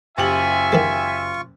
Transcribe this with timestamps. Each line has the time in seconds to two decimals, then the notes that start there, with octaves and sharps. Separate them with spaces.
0.18 F#1 F4 G4 E5 G#5 C#6 F#7
0.72 D#3 E3 G#3